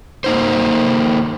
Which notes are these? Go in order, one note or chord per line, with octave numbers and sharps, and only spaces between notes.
A#3 D#4 C5